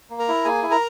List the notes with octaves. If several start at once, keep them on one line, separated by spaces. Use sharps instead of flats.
A#3
A#4 A#5
E4
A#3 G#4 G#5
E4
A#4 A#5